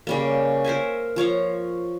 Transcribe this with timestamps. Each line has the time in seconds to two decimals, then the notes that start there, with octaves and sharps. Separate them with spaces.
0.07 C#3 G3 A#3
0.64 A#4 C5 E5 G#5
1.16 F3 C#5 F5 A#5